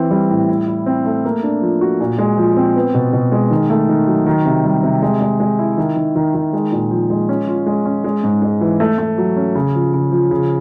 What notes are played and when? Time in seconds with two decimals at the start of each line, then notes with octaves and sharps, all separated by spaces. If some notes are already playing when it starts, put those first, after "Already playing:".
Already playing: E3 C4
0.11 G3
0.30 A2
0.49 E4
0.68 E4
0.86 C4
1.06 A3
1.25 A#3
1.43 D4
1.62 F3
1.81 F#4
2.00 A#2
2.19 G#3
2.38 F3
2.56 C4
2.76 B3
2.94 B2
3.13 B2
3.32 G#3
3.51 D#3
3.70 A3
3.89 D#3
4.07 F#3
4.26 D#3
4.45 C3
4.64 G3
4.83 C3
5.02 G#3
5.21 G#3
5.40 G#3
5.59 E4
5.78 D#3
5.96 D#3
6.15 D#3
6.34 D#3
6.53 G#3
6.72 A#2
6.91 F3
7.10 G#3
7.29 C#4
7.48 F4
7.66 G#3
7.85 C#4
8.04 G#3
8.24 G#2
8.42 G#3
8.61 E3
8.80 A3
8.98 A3
9.18 F#3
9.36 C#4
9.55 C#3
9.75 F3
9.94 C#3
10.12 F3
10.31 C#3